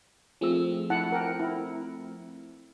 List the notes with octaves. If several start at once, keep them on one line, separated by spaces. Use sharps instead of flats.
F3 A3 C4 G#4 E6
E4 F#5 A5
A#4 G5
E4